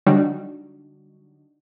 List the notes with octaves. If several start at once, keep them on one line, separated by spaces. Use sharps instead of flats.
D3 F#3 G3 D4 D#4 F#4